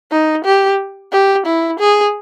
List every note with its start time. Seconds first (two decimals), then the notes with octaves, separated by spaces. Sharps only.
0.12 D#4
0.45 G4
1.13 G4
1.47 E4
1.80 G#4